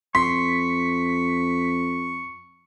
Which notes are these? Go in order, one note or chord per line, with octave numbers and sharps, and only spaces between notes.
F2 C6 C#6 B6